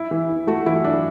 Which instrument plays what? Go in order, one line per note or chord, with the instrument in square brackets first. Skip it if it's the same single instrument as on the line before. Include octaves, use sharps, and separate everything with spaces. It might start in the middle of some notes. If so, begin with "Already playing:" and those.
Already playing: [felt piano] E4
[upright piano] E3
E4
[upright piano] A3 [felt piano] F#4
[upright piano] E3 [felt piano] E4
[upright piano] E3 [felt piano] D4